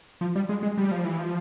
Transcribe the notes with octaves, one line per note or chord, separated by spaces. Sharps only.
F3
G3
G#3
G#3
G3
F3
E3
F3